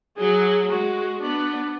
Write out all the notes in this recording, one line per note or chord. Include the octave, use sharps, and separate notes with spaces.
F#3 G#4
G#3 F#4
B3 D4